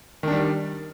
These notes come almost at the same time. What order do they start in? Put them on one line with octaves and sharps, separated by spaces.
D#3 D4 G3